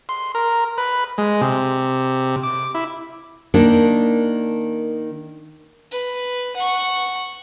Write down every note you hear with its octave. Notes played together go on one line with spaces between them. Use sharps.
C6
A#4
B4
G#3
C3
D6
E4
D#3 A#3 D4
B4
F#5 C#6